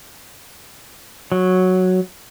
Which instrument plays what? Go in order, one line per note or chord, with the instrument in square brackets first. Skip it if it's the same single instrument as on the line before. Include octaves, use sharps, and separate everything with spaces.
[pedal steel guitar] F#3